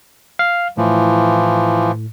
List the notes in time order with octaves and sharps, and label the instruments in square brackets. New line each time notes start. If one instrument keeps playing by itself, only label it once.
[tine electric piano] F5
[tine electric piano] A2 [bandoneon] E3 F3